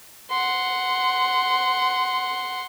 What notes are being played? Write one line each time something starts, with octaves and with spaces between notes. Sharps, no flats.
F#5 C6